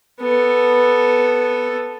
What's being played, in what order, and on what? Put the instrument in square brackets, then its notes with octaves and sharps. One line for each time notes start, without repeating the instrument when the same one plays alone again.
[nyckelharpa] B3 A4